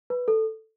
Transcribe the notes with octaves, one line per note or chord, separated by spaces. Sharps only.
B4
A4